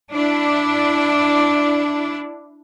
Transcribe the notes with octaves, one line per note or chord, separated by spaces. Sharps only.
D4 E4 D5